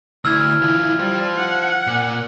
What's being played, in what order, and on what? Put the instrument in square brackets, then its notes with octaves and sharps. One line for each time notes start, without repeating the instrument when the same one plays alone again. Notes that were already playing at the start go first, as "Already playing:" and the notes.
[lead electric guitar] D2 [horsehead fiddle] E4 [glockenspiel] E6 F6 G#6
[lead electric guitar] E3 F4
[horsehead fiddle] G3 [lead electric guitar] F4 C5
[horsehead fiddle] F#5
[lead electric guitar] A#2